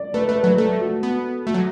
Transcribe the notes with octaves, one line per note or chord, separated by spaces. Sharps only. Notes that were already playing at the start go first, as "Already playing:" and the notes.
Already playing: D5
A3 B4
A3 B4
F#3 B4
B4
A3 A4
F#4
B3
A3 F#4
F#3